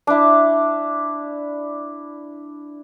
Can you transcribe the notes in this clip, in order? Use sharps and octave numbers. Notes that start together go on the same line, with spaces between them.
D4 E4